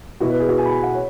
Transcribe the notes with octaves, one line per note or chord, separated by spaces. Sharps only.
B2 B3 E4 F#4
B4
G#4
F#4
G#5
B5
G#5
F#5
C#5